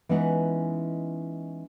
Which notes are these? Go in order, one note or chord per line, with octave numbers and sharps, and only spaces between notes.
E3 G#3 B3 C#4 D#4 E4